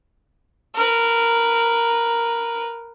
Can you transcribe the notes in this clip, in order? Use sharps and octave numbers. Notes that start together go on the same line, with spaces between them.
A#4 B4